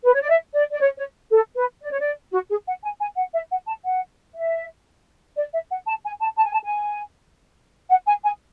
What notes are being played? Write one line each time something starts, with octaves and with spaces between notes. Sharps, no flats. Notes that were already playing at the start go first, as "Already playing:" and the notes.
B4
C#5
D5
E5
D5
D5
C#5
C#5
A4
B4
D5
C#5
D5
F#4
G#4
F#5
G#5
G#5
F#5
E5
F#5
A5
F#5
E5
D5
E5
F#5
A5
G#5
A5
A5
G#5
A5
G#5
F#5
G#5
G#5